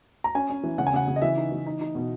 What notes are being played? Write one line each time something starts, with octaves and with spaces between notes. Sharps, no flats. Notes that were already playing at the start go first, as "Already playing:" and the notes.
A#5
C#4 G#5
C#4
E3
C#3 F#5
G#5
C#3 F#5
C#3
D#5
E3 E5
D#4
E3
D#4
D#4
B2